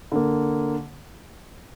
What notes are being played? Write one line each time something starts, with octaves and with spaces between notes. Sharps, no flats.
D3 A#3